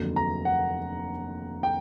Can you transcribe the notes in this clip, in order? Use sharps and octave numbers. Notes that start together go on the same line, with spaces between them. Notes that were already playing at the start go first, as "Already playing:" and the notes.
Already playing: F1 D#2 D3 F#3
A#5
F#5
G5